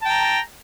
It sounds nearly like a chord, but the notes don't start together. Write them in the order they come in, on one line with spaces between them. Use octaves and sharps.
A5 G5 A#5